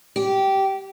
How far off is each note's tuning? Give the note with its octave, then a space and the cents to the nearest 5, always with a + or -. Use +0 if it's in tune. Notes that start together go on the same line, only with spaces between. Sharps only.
G4 -15